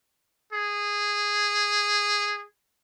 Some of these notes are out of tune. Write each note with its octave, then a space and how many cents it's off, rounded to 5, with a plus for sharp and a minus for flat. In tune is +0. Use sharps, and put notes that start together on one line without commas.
G#4 -10